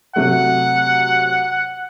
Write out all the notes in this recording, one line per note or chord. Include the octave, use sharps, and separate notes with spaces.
C3 F#3 A3 F#5